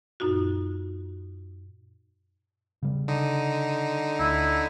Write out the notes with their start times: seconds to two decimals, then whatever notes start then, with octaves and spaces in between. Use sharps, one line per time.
0.20 F#2 A#2 D#4 F4 F#4
2.83 C#3 G3
3.08 D3 D#4
4.19 D2 E4